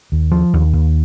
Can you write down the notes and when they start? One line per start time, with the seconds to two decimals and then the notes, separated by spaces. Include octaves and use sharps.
0.12 D#2
0.32 F3
0.53 D#2
0.73 D#2